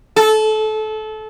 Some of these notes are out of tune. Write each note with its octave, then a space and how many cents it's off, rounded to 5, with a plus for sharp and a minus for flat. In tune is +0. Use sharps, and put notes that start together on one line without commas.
A4 -25